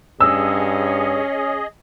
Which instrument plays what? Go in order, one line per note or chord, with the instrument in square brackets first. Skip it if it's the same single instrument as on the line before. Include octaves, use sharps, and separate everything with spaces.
[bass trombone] G2 [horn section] C#4 [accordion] G#4 D#5 [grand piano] E6